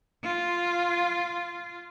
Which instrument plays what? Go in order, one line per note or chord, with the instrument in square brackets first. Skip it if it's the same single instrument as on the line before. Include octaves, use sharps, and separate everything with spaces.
[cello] F4